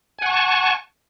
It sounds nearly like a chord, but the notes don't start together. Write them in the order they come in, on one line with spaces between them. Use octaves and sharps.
G#5 F#5 C#6 A5